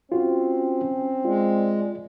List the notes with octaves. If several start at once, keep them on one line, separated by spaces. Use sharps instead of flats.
C4 C#4 F4 F#4
G#3 F4 D5